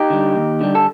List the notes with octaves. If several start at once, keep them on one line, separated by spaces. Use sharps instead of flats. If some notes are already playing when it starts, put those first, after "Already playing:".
Already playing: D#4 G4
D3 G3
D#2
D3 G3
A4